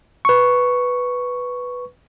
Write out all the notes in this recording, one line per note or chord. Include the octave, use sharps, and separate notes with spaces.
B4 C#6